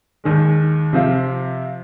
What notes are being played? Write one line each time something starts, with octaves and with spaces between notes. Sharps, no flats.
D#2 D#3 G#3
C3 F3 C4 F4